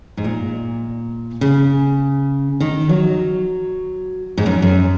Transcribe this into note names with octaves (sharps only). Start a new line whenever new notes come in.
G#2
A#2
C#3
D#3
F#3
G#2
F#2
F#2